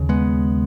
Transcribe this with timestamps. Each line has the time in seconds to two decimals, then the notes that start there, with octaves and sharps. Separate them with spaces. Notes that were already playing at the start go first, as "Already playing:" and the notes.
Already playing: D#2 C#3
0.09 G#3 B3